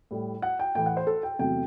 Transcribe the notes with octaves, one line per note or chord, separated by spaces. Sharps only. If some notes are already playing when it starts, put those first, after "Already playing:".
A2 G3
F#5
G5
A2 E3 A3 G5
F#5
C5
A4
G5
E2 C3 F#3 A3 G5